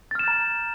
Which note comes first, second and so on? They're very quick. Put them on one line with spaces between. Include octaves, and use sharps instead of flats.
A6 F6 E7 G6 A#5